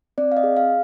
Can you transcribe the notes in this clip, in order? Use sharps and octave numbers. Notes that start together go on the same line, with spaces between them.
C4 D5
F5
D#5
G#4
F5